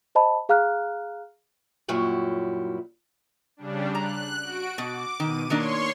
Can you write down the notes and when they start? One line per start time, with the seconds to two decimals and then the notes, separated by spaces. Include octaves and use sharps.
0.15 C5 D#5 A5 B5
0.49 G#4 F5 A#5 F6 F#6
1.88 F#2 A#2 F#3 G3 E4
3.57 C#3 G3 D4
3.95 A#5 F#6
4.41 F#4 D7
4.78 B2 D6
5.20 B2 D#3 D#7
5.50 D#3 A#3 D4 C#5 C6 C#6